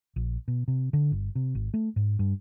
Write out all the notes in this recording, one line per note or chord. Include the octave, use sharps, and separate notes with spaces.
A#1
B2
C3
D3
G1
C3
G#1
A3
G#2
G2